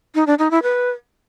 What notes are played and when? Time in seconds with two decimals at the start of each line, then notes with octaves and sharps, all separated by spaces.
0.15 D#4
0.27 D4
0.39 D#4
0.51 E4
0.63 B4